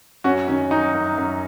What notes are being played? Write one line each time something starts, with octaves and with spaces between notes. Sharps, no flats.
F#2 C#4 F#4
D#3 C#4
F#3 D#4
F#2
F#2